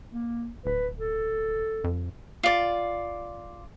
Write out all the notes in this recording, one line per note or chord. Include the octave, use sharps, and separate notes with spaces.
A#3
D1 B4
A4
F2
F4 D5